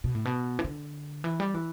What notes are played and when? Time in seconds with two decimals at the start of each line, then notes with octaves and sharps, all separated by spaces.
0.04 B2
0.15 A2
0.25 B2
0.59 E3
0.64 D3
1.24 E3
1.40 G3
1.54 E3